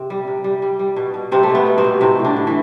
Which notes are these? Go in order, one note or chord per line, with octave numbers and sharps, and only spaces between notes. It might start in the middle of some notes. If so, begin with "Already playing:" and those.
Already playing: C3 C4
G3
C3
G3
G3
G3
B2
B2
C3 G3 C4
A3
B2
B3
B2
C3 C4
B2
A2 C3 C4
A2
D3 D4
A2
E3